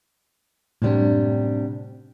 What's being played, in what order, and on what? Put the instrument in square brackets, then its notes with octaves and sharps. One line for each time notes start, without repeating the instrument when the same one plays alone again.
[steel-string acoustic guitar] F#2 C3 G3 [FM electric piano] A2 D4